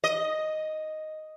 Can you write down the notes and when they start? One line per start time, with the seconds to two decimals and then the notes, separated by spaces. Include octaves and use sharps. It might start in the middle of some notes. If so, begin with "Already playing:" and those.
0.04 D#5